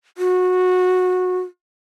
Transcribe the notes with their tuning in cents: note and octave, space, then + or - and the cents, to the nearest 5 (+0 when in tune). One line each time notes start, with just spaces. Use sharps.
F#4 -15